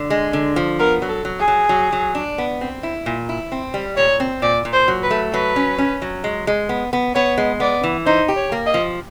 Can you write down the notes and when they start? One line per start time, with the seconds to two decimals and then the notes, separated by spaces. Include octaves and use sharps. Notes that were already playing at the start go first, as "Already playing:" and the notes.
Already playing: D3
0.10 G#3
0.33 D3
0.56 F3
0.79 B3 A#4
1.02 F#3
1.09 A4
1.25 F#3
1.40 G#4
1.48 F#3
1.69 F#3
1.93 F#3
2.15 D4
2.38 B3
2.61 C4
2.83 E4
3.06 A#2
3.29 E4
3.52 C4
3.74 G3
3.97 A#2 C#5
4.20 C4
4.42 A#2 D5
4.65 A#2
4.73 C5
4.88 F#3
5.03 B4
5.11 A3
5.33 F#3 B4
5.56 C#4
5.78 C#4
6.02 F#3
6.24 G#3
6.47 G#3
6.69 B3
6.93 B3
7.15 B3 C#5
7.38 G#3
7.60 B3 D5
7.84 E3
8.06 D#4 C5
8.28 G4
8.36 C#5
8.52 A#3
8.67 D#5
8.74 F3